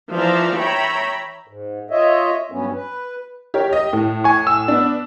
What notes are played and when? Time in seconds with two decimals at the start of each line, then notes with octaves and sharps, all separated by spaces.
0.12 E3 F3 D5 E5 F5 A#5
0.57 C#5 E5 G5 A#5 B5
1.47 G#2
1.91 F4 C#5 D#5 E5
2.52 G2 F#3 B3 C#4
2.73 B4
3.54 G4 A#4 C#5
3.70 G4 D#5
3.93 A2
4.24 G#5 C#6
4.47 E6
4.68 B3 D4